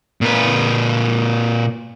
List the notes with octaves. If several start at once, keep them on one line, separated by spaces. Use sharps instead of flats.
A#2 B4